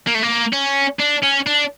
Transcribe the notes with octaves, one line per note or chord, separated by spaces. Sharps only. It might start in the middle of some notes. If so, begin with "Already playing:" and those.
A#3
A3
A#3
C#4
D4
C#4
D4